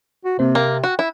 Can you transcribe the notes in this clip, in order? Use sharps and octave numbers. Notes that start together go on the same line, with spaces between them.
F#4
C3 A#3 C4 C5
A#3 G5
F#4
E4